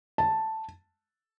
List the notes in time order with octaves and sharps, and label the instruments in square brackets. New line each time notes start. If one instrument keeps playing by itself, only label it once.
[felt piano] A5